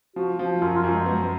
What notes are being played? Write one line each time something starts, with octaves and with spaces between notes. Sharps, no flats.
F3 F#4
F3
F#2 F4
F4
F#2
G#3
B3